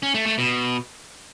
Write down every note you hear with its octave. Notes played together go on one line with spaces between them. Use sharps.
C#4
A3
A3
B2